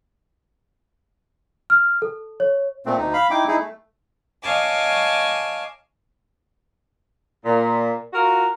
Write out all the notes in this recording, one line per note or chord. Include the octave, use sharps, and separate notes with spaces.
F6
A4
C#5
A#2 A3 C4
D2 D#4
F5 B5
D#4 E4 G5 D6
D#4 E4 G#4
A3
C#5 D#5 F5 G#5 A5 D6
A#2
F4 F#4 A#4